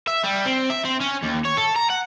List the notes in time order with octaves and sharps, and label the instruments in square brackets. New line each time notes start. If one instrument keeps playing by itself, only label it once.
[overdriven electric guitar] E5
G3
C4
E5
C4
C#4
D#2
C#5
A4
A#5
F#5